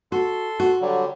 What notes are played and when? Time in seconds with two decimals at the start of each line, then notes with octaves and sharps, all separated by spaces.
0.12 F#4 A4 C6
0.60 F#4
0.81 D3 F#3 G3